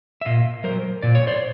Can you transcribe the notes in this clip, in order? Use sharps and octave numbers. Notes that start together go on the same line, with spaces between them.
E5
A#2 D#5 F5
F#3 A#4 C5
A#2 D5
C#5
C5 D5